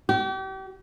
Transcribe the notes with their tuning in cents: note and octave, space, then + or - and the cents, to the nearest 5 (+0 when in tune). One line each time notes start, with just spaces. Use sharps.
G4 -40